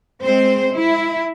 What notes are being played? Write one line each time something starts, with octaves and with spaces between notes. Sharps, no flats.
G#3 C4 C5
E4